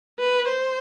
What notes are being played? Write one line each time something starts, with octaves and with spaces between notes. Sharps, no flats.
B4
C5